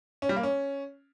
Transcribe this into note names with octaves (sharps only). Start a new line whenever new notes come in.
C#4
G3
A#3
C#4